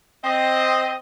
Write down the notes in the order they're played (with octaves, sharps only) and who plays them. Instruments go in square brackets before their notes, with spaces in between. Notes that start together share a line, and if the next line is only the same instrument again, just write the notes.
[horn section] C4 D#5